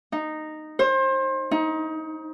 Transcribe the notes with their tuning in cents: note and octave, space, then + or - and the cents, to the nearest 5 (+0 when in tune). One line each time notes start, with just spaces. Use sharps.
D#4 -10
C5 +30
D#4 +25